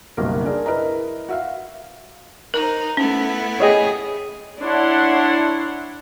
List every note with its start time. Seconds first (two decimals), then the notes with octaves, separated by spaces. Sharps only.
0.17 F#1 B1 F#3 G3 A#4
0.44 D4 G#4 A#4 D5
0.66 E4 A#4 B4 D#5 A#5
1.29 F#4 E5 F5
2.54 D#4 A#4 C5
2.97 A3 B3 C#4 E4
3.60 G#4 C#5 D#5 G5
4.60 D4 E4 C#5 F#5 C6